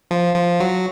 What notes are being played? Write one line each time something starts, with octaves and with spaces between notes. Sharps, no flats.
F3
F3
F#3